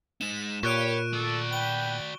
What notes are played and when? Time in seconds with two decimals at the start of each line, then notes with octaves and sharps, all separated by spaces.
0.21 G#3 D#4 E7
0.63 A#2 G4 B4 C#5 C#6 F#6 D7
1.13 F#4 A4 D5
1.53 B4 G5 G7